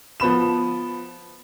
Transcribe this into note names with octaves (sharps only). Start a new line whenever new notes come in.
F3 B3 B5 E7